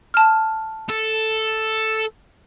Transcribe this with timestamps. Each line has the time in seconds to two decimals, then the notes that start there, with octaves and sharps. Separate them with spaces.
0.14 A5 F6
0.89 A4